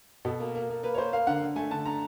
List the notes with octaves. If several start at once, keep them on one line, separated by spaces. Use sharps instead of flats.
B2 A4
A#3
A#3
A#3
A#3 B4
C#5
A#3 C5
A#3 F5
D3 F#5
D3
A3 G#5
D3 A5
D3 A#5